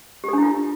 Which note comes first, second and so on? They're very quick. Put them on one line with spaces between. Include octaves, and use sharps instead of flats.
G4 A4 D4 E4 F4